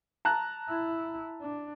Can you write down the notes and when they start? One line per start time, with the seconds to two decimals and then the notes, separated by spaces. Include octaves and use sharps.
0.25 A5 A#5 F#6
0.69 E4
1.41 D4